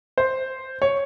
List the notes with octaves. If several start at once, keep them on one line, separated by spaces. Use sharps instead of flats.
C5
C#5